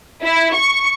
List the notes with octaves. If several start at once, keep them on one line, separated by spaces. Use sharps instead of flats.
E4
C#6